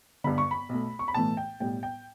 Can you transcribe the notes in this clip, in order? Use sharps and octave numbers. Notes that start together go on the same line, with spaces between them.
G1 G2 D3 B5
C#6
B5
B1 B2 A3
C#6
B5
B1 A2 E3 A3 A5
G5
B1 A2 G3 G5
G5